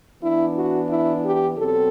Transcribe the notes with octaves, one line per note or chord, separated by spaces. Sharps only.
E3 B3 D4 E4
F#4
E4
G4
B2 F#3 C4 A4